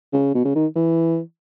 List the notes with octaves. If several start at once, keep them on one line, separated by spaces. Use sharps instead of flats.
C#3
B2
C#3
D#3
E3